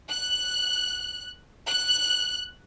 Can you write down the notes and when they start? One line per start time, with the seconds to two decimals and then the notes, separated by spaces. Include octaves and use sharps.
0.10 F#6
1.67 F#6